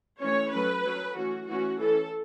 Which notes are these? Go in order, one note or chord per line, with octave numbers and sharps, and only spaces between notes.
E3 A3 C#4 C#5
F#3 A3 C#4 B4
F#3 C#4
E3 A3 C#4 F#4
E3 A3 C#4 F#4
E3 C#4 A4